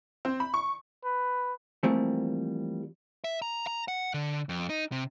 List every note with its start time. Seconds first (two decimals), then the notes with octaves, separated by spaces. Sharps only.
0.25 C4
0.40 B5
0.54 C#6
1.05 B4
1.83 E3 F3 G3 A3 A#3 C4
3.24 E5
3.42 A#5
3.67 A#5
3.88 F#5
4.14 D3
4.49 F2
4.69 D#4
4.92 C3